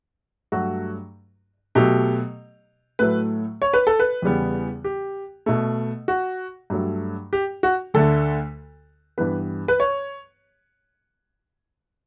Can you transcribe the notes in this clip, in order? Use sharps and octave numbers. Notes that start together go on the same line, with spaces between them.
G2 F#3 A3 F#4
B2 F#3 A3 G4
A2 F#3 A3 B4
C#5
B4
A4
B4
E2 C#3 G3 B3
G4
B2 A3
F#4
G2 F#3 A3
G4
F#4
D2 D3 A3 A4
G2 E3 B3 B4
B4
C#5